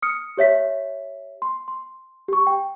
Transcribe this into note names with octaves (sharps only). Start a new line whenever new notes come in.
D#6 F6 C#7
G4 C#5 E5 B6
C6
C6
G4 C#6
G5